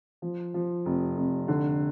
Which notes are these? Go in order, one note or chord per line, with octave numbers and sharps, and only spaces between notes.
F3
F3
F1
F1
D3